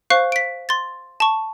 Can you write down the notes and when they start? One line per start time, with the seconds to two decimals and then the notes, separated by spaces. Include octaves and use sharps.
0.10 C5 F5 C#6 F#6 C7
0.32 B6 D7
0.69 C6 A6
1.20 A5 C#6